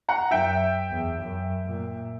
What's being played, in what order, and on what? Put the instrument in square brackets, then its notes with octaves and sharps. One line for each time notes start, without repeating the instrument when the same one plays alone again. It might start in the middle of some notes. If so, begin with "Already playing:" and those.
[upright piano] F#5 A#5
[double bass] F#2 [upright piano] E5 G5
[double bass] E2
F#2
A#2